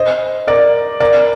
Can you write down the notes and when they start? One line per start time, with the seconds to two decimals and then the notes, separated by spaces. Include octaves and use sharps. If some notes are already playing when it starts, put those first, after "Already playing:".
Already playing: C5 D#5
0.47 A#4 D5
1.00 A#4 D5